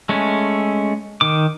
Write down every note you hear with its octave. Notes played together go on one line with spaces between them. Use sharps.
G#3 A3 C#4
D#3 D6